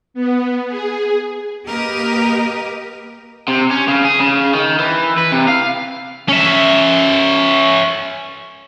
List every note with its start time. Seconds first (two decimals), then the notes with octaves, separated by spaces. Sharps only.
0.14 B3
0.68 G#4
1.66 A#3 G4 A#4 B4 D#5
3.48 C3
3.71 C#4
3.88 C#3
4.04 G#4
4.20 C#3
4.54 D#3
4.79 E3
5.18 B4
5.32 C3
5.48 F5
6.29 C#4 E5